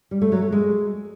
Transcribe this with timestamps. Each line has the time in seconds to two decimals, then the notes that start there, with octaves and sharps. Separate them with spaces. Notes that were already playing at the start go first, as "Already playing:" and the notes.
0.11 G3
0.22 A3
0.32 F#3
0.42 A3
0.52 G#3